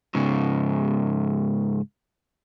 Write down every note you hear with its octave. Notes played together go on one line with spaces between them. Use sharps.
G#2 C#3